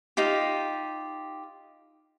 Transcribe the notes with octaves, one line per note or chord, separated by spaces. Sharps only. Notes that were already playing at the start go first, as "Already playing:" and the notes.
D#4 F4 G4